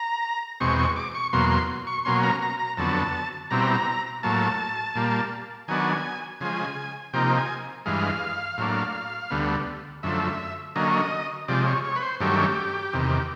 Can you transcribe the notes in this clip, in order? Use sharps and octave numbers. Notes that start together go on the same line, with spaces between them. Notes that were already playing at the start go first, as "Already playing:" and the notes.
Already playing: A#5
E2 B2 G#3 C4 C#6
C#6
D6
C#6
E2 B2 F#3 A#3 C6
C6
C#6
B2 F#3 A#3 C#4 C6
A#5
A#5
A#5
F2 D3 F#3 B3 A5
B2 G3 C4 E4 A#5
A2 F#3 A#3 A5
A#2 G3 A#3
D#3 F#3 B3 D4 G#5
C#3 F3 G#3 G#5
C3 F3 A#3 D#4 G5
G#5
G2 E3 G#3 F5
A2 F#3 A#3 D4
D2 D3 G3 B3
F#2 D3 F3 A3 E5
D3 F#3 A#3 C#4 D#5
C3 F3 G#3 D5
C#5
C#5
B4
C5
G2 D#3 F#3 A3 C#4 G4
E2 C3 D#3